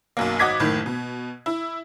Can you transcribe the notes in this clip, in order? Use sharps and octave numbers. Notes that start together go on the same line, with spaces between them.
B1 F#2 A#3
G#1 F#4 D#5 D6 G#6 B6
F#1 A2 D#3
B2
E4